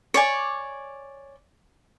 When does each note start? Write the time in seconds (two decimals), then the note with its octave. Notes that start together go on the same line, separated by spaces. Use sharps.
0.14 C#5 D5 G#5